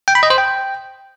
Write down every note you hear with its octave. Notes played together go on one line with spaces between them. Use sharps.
G5
B5
D#5
C5
G5